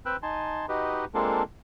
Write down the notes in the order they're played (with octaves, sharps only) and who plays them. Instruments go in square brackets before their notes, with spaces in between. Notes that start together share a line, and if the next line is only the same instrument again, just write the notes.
[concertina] C4 B4 G5 E6 F#6
D#4 G#5 A5 C6
D#4 F#4 G4 B4 D#5
G#3 A#3 C4 D4 F4 A4